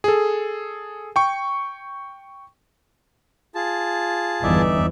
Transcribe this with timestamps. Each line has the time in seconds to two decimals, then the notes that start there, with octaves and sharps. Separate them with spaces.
0.04 G#4 A4
1.16 G5 C#6
3.55 F4 G#4 A5
4.43 G1 E2 E3 D#4 D5 E5